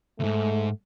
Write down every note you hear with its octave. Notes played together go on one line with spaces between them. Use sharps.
D2 G#2 A3